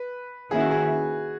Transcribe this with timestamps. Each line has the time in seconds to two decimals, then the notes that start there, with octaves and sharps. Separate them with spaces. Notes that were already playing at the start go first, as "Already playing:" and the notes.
Already playing: B4
0.51 D#3 A#3 C#4 E4 G#4
0.60 F#4
0.71 G#4